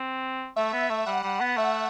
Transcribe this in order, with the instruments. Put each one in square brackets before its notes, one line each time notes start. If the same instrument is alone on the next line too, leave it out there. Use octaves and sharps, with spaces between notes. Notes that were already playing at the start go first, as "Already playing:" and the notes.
Already playing: [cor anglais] C4
[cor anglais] A3 [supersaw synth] E5
[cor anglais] B3
A3
[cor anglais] G3 [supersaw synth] F#5
[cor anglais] G3
B3
[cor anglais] A3 [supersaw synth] E5